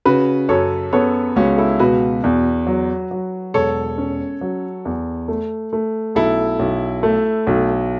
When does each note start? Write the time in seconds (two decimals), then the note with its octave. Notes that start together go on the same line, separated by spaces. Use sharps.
0.05 C#3 F#4 B4
0.49 F#2 A4 C#5
0.93 B3 A4 C#5
1.36 C#2 C#4 F#4
1.58 E4 A4
1.79 B2 F#4 B4
2.24 E2
2.67 F#3
3.11 F#3
3.54 E1 A4 C#5
3.98 C#4
4.41 F#3
4.85 E2
5.28 A3
5.73 A3
6.15 B1 E4 A4
6.59 B1
7.03 A3
7.47 B1